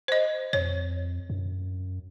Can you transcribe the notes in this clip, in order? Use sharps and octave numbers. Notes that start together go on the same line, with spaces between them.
C5 D#5
F2 C#5
F#2